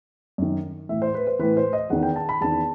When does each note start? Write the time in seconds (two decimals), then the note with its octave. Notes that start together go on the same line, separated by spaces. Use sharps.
0.38 F#2 D#3
0.89 A2 E3 E5
1.02 C5
1.14 B4
1.27 C5
1.39 A2 E3 B4
1.57 C5
1.73 D#5
1.90 E2 D#3 F#5
2.03 G5
2.16 A5
2.29 B5
2.41 E2 D#3 A5